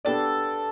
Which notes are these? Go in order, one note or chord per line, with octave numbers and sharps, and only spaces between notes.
B3 D4 G4 A4 D5